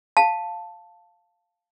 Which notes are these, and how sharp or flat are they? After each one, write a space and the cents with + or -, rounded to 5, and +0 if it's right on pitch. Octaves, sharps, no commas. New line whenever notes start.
F5 +0 A5 +0